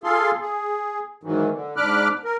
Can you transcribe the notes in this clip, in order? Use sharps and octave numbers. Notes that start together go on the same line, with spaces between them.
F4 G#4 A4 F5 C6
G#4
G#2 D#3 E3 F#3
D3
G#2 D4 B5 D6 F6 F#6
A#4